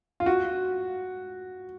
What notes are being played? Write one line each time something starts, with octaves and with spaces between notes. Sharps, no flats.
F4
F#4